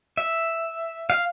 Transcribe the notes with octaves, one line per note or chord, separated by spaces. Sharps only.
E5
F5